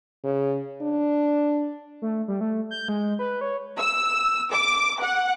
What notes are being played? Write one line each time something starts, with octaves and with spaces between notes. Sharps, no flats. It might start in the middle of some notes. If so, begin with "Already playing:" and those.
C#3
D4
A3
G3
A3
G6
G#3
B4
C#5
E6
D6
F#5